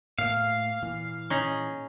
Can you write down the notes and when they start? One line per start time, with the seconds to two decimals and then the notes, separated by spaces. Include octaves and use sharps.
0.19 A2 A#3 F5
0.83 A#2 E3
1.30 C#4 D#4 G#4